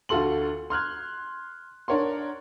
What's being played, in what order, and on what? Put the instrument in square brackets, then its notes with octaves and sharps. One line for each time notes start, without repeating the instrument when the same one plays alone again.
[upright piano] D2 F4 F#4 A4 C6 F#7
C6 F6 F#6 G#6
D4 A#4 C#5 F#5 C6